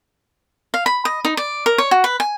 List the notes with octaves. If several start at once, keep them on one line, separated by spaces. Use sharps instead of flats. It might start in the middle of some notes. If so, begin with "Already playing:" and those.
F5
B5
D#5
D#4
D5
A#4
C#5
F#4
B4
G#5